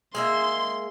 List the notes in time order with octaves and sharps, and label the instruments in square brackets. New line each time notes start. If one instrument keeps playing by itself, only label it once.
[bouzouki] G#3 A#3 E5 [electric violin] C6